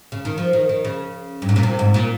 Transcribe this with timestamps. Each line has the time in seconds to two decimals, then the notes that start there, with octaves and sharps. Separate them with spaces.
0.12 C#3
0.25 D#3
0.38 F3
0.53 D#3
0.69 D#3
0.84 C#3
1.42 G2
1.49 G#2
1.56 A#2
1.63 C3
1.79 G#2
1.94 A#2